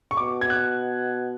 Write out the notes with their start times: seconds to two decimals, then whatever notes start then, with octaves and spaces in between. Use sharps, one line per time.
0.11 C#6
0.17 B2 D6
0.41 G#6
0.50 F#6